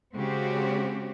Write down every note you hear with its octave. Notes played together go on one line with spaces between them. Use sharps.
C#3 G#3 C4 F#4 G4